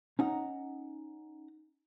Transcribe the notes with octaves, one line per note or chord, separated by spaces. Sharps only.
C#4 D#4 F#5 A#5